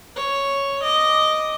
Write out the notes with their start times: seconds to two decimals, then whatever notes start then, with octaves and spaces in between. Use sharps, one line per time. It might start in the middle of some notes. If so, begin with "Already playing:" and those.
0.16 C#5
0.82 D#5 D6